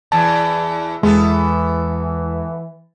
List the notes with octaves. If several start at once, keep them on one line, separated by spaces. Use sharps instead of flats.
E2 E3 A5
E2 E3 G#3 B3 A4